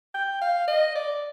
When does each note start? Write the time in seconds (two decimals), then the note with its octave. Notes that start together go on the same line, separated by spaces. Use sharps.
0.15 G5
0.42 F5
0.68 D#5
0.96 D5